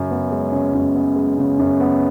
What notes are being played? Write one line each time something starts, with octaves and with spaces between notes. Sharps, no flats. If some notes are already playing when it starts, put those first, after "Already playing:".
Already playing: F#2 C#3
B3
G#3
C#3
F#2
B3
G#3
C#3
F#2
B3